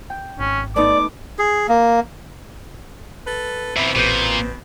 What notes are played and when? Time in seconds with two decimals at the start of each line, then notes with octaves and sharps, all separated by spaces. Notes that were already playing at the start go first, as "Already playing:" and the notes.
0.10 G5
0.39 G#1 C#4
0.76 A3 B3 D#4 D5 D6
1.39 G#4
1.69 A#3
3.27 A4 B4
3.76 G#2 B2 E3 C4 E5 B5
3.96 A1 A#2 B4 G6